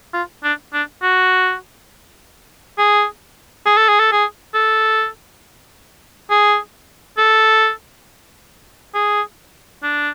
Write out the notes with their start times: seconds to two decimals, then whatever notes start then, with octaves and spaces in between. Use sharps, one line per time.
0.14 F4
0.43 D4
0.73 D4
1.02 F#4
2.78 G#4
3.66 G#4
3.78 A4
3.89 G#4
4.00 A4
4.12 G#4
4.54 A4
6.30 G#4
7.18 A4
8.95 G#4
9.83 D4